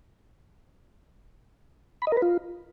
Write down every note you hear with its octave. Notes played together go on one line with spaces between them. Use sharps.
B5
D#5
A#4
B4
F4